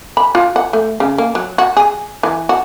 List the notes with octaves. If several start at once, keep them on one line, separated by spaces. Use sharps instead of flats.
B5
F4
F#5
A3
C#3
A#3
F#3
F#4
G#4
E3
F#4